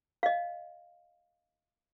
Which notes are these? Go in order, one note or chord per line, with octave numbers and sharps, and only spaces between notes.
D#5 F5